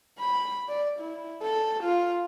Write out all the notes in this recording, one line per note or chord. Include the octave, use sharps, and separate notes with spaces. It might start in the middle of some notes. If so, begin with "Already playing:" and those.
B5
D5
E4
A4
F4